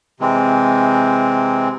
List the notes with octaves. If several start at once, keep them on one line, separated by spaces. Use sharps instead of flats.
C3 E3 G#3 C4